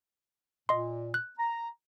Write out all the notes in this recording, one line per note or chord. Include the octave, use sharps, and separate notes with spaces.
A#2 D#5 C6
F#6
A#5